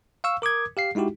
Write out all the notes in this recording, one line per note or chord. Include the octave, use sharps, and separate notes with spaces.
F5 C#6 E6
A#4 D6 D#6 G#6
G4 F5 C7
G#3 D#4 E4 F#4 G4